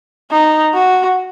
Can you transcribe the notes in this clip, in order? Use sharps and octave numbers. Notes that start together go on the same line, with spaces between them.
D#4
F#4